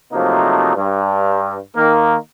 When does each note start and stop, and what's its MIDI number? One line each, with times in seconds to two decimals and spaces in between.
0.12 0.74 48
0.12 0.74 53
0.12 0.74 54
0.12 0.74 57
0.12 0.74 58
0.12 0.74 63
0.76 1.57 43
1.76 2.16 51
1.76 2.16 58